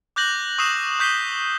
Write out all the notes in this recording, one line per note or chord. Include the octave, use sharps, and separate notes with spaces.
D6 F#6 G6 A#6 F#7
C#6 D#6 E6 C7 E7 F#7
C#6 G6 B6 C7 E7 G7